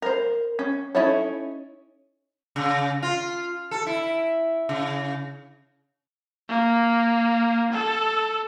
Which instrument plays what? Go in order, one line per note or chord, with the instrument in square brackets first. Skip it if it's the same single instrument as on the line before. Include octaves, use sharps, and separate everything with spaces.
[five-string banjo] A#4 C5
C#4
C#4 D#4 E4 A4 C#5
[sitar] C#3
F4
A4
E4
C#3
[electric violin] A#3
A4